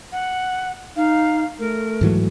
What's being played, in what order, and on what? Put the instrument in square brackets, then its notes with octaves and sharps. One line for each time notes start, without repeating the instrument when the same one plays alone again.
[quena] F#5
[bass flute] D#4 [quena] F5
[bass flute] A3 [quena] A#4
[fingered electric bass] G#2 E3 F#3